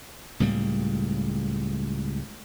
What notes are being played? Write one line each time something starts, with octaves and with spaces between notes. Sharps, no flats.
C#2 A2 G3 A#3